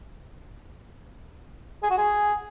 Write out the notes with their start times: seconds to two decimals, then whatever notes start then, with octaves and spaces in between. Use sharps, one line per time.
1.83 G#4
1.90 F#4
1.98 G#4